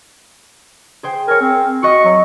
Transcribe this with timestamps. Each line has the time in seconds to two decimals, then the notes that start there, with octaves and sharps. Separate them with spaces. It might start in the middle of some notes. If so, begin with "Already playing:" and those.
1.03 G#4 C5 G5
1.28 A#4 C#5 G#5
1.41 C4
1.83 F#4 D#5 C#6
2.05 F#3